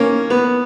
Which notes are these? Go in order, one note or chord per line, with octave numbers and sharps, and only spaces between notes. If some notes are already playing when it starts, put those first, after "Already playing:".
Already playing: D#2 E3 A#3 C#4
B3